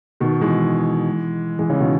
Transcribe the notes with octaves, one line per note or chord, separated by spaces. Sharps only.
B2 D#3
E3 G#3
E3 G#3
C#3 E3
B2 D#3